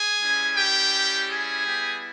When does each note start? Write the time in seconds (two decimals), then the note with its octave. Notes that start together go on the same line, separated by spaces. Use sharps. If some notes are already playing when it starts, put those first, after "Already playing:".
Already playing: G#4 G#5
0.20 G3 C#4 E4
0.57 G4 G5
1.29 G#4 G#5
1.66 G3 B3 E4 G4